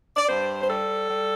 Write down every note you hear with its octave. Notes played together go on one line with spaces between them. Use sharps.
D5
G2 C5
C5
G3 A4
G3